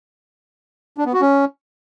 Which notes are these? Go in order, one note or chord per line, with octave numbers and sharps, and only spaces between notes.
D4
B3
F#4
C#4